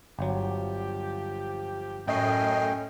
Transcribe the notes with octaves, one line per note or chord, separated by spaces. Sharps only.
G1 F3 F#3 G4
F#2 A2 A3 C#4 D#5 G5 C7